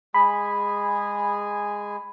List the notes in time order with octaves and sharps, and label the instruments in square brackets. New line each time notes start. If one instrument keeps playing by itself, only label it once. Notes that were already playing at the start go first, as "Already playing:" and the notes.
[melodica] G#3 G#4 G#5 [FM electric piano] B5